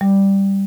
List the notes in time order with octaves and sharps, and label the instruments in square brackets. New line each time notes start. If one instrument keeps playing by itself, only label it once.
[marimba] G3